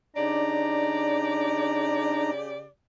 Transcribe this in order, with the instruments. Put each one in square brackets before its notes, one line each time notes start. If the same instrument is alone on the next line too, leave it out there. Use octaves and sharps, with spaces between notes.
[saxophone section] C#3 G4 D5 [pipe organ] D4 D#4 A#5